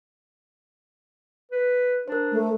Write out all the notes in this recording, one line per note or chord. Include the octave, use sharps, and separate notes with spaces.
B4
D4 A#4 C5
A3